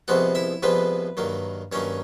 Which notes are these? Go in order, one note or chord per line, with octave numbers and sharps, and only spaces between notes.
C2 C3 F3 G#3 B3 F#4 F#5
E4 E5
C2 C3 F3 G#3 B3 B4
G2 D#3 F#3 A#3
G2 D#3 F#3 A#3 C#4 C#5